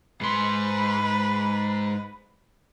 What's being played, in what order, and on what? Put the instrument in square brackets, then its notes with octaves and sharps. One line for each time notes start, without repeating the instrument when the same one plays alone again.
[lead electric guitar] G#2 C6 [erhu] B4